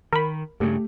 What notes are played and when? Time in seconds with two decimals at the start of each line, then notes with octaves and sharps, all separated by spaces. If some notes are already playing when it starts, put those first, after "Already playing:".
0.13 D#3 A#4 B5
0.60 G2 C#3 A3 G4